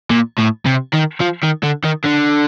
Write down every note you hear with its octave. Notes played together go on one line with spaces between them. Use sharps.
A#2
A2
C3
D#3
F3
D#3
D3
D#3
D3